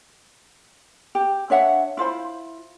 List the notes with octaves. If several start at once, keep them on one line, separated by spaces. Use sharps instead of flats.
G4
D4 C#5 E5 F#5
E4 F4 C5 B5